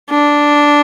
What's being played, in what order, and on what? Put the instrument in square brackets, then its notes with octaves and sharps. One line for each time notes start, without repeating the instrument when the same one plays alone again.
[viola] D4